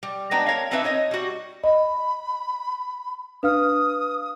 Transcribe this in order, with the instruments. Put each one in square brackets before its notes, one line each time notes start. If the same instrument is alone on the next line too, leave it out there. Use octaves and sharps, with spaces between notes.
[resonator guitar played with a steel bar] G3
G#3 B3 D4 G5 A#5
A#4 C#5 F5
B3 C4 D4 D#4 B4 E5
D#4 C#5 D#5
G3 F#4
[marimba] D#5 [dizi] B5
[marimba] D4 [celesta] B4 F5 F6 [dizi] D#6